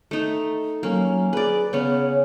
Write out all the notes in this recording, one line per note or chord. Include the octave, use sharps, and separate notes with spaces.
A3 D#4
F#3 A#3 C#4
G#4 B4 D5
C#3 B3 C#4 C#5